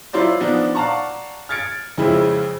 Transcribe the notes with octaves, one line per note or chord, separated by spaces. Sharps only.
F#3 E4 F4 C5 D5
F3 B3 D4 D#4
D5 F5 F#5 A5 A#5 C#6
F6 G#6 A6 C#7 D7
F2 C#3 F3 G#3 E4